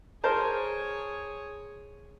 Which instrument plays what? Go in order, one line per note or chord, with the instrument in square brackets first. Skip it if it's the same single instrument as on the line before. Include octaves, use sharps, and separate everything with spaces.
[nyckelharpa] G#4 C#5 [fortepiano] A#4 C5 A5